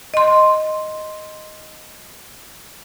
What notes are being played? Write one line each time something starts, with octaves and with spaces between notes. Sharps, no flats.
D#5 C6